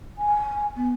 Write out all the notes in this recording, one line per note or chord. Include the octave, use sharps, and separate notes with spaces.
G#5
B3